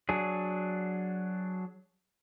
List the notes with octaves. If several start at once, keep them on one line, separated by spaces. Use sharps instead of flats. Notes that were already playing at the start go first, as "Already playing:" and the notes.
F#3 D4 G#4